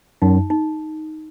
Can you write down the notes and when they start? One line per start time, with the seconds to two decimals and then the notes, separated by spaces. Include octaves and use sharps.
0.22 F#2 D#4
0.50 D#4